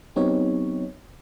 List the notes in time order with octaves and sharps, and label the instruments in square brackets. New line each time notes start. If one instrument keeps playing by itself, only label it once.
[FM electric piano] F#3 B3 C4 D#4 G4 C#5